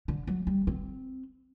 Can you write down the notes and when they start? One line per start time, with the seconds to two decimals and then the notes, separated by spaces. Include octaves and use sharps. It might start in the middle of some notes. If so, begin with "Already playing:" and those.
0.08 D3
0.27 F#3
0.47 G3
0.67 C4